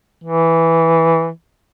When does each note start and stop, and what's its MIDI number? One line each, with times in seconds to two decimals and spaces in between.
0.24 1.29 52